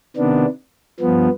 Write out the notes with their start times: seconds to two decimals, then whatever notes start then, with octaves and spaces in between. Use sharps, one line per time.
0.17 C3 D#3 B3 D4
1.00 G2 F3 B3